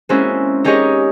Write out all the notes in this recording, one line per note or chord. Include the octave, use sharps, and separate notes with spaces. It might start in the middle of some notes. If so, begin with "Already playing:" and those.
G#3 A#3 C4 C#4 E4 F#4
D#4 G4 G#4 A#4 C#5 D#5